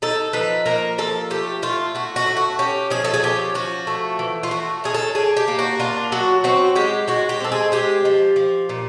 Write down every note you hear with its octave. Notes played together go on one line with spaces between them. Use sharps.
D#4 A4
F3 B4
A#3 A#4
F3 A4
A3 G4
A3 F4
A3 F#4
F#4
A3
F#4
C#4 G4
F3 G#4
A4
G#4
C#4 G4
F3 F#4
A3
E3
F4
A3 F#4
C#4 G#4
A4
D4 G#4
G4
A#3
F#4
D4 F4
F#3 F#4
C4 F#4
G#3 G4
G#3 F#4
G4
C4 A4
G#4
G#3 G4
F3
F3
A#2